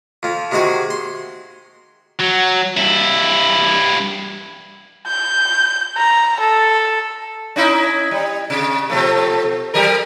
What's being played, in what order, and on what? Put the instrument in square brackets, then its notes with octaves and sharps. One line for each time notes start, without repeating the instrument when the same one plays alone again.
[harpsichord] F2 F3
C3 D#3 G#3 F#4 G#4
C6
[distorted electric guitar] F#3
G2 E4
[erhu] G6
A#5
A4
[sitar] C#4 D#4 E4
G3
C3
B2 F3 A3
F#3 G3 A#4